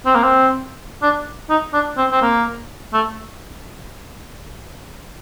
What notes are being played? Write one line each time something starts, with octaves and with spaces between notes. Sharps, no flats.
C4
A#3
C4
D4
D#4
D4
C4
C4
A#3
A3